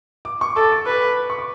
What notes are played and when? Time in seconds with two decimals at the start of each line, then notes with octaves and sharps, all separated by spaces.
0.25 D6
0.41 C#6
0.56 A4 D6
0.72 D6
0.86 B4
1.30 C#6
1.38 D6